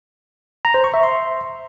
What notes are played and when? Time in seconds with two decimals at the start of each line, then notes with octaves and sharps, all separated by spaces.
0.65 A#5
0.74 C5
0.84 C#6
0.94 E5
1.03 C6